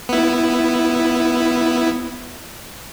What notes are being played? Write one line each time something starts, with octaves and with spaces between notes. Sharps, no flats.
B3 E4